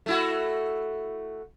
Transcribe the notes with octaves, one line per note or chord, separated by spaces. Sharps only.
A3 E4 F#4